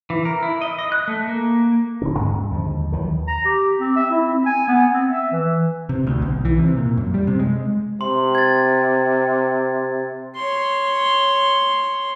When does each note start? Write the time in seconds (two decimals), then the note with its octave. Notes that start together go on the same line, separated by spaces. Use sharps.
0.10 E3
0.25 A#4
0.43 E4
0.62 D#5
0.79 D#5
0.92 F#6
1.08 A3
1.27 A#3
2.02 D#1 D3 C#4
2.19 G2 C#4
2.50 D#2 D3 F3 G#3
2.92 D#2 D#3 E3 F#3
3.28 A#5
3.45 G4
3.80 C4
3.97 E5
4.11 E4
4.28 C4
4.46 G#5
4.68 B3
4.93 C4
5.09 E5
5.32 E3
5.89 C3
6.07 D2
6.22 B1
6.45 E3
6.59 C3
6.77 A#2
6.97 F#2
7.14 G3
7.27 C3
7.39 G#3
8.01 C3 C6
8.35 G#6 A6
10.36 C#5 C6